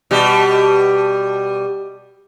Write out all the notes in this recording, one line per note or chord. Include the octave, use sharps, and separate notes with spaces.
B2 G3